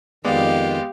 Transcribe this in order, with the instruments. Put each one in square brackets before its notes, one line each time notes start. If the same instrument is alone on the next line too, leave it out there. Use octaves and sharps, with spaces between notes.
[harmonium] F2 D#3 [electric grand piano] G#3 B3 D5 [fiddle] G4 F5